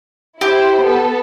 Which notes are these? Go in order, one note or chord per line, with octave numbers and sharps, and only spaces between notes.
E4 G4 C5
B3 A4